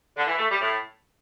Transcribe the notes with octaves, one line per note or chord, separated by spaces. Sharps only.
D3
E3
A3
G3
A2